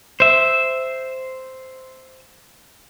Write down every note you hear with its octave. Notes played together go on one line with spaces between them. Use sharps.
C5 E5